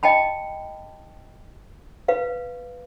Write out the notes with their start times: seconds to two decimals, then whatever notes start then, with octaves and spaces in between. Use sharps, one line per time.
0.03 D#5 G5 A5 B5
2.08 B4 F5